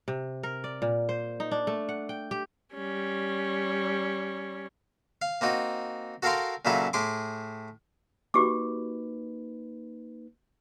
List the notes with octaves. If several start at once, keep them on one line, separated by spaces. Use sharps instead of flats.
C3
A#4
D5
A#2
C5
D#4
D4
A3
F#5
G5
G4
G3 C#4
F5
A#3 C4 D#4 F#4
F#4 A4 A#4 F5 G5 C6
A#2 C#3 F#3 E4 G#4 A4
A2 G#4 C6 D6
A#3 D#4 F#4 G4 B4 D6